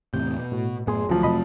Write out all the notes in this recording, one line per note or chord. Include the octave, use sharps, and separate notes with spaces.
E2 A2 C3 G6
B2
A2 F#4
F#2 A2 B3 G#4 C6
D2 F3 F#3
F2 C3 A3 D#5 B5